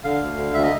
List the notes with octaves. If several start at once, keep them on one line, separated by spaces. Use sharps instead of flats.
D3 F5
D2
D3
D2 E5
D#5